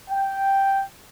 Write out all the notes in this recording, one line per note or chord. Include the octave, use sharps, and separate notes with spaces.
G5